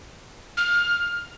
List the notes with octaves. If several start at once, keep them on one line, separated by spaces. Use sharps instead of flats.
F6